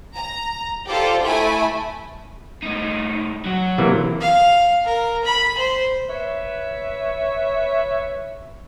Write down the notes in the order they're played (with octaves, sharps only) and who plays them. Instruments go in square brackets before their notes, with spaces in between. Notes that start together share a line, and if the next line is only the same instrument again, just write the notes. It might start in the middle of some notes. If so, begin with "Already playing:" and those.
[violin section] A#5
F4 G4 A4 C5 D5
A3 E4 E5 G#5 B5
[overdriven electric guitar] A2 D#4
F#3 F#4
[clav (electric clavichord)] C3 E3 A#3
[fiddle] F5
A#4
B5
C5
[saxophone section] B4 C#5 E5